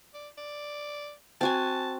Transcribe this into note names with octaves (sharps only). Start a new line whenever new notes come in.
D5
D5
C4 F#4 G#5 A5